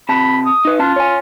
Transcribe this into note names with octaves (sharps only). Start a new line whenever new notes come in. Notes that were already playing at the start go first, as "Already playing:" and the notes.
C3 A5 B5
D#6
D#4 B4
C#4 F4 A5
C#5 G#5